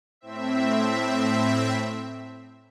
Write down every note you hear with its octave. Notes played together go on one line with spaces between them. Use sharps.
A2 C4 E5